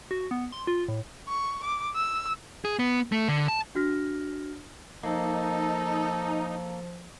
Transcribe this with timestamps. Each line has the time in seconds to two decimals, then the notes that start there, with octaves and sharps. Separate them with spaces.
0.11 F#4
0.31 B3
0.52 C6
0.67 F4
0.88 A2
1.29 C#6
1.63 D6
1.95 E6
2.65 G#4
2.79 B3
3.12 A3
3.28 D3
3.48 A5
3.75 D4 F#4 F6 A#6
5.03 F3 A#3 D#4 A4